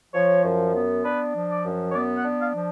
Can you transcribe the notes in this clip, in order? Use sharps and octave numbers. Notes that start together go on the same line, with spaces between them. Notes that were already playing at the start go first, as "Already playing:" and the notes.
F3 C#5
F#2
B3
D4 B4
F3
D5
F#2
C#5
B3 D5
F#5
D4
F5
F3